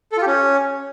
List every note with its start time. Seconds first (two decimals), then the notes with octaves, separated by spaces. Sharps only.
0.12 A4
0.17 F4
0.22 G4
0.27 C#4